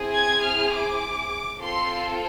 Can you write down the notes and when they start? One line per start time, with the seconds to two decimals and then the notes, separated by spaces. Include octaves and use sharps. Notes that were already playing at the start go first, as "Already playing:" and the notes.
Already playing: C4 E4 G#4
0.16 G#6
0.44 F6
0.73 D6
1.60 C4 F4 A4 C6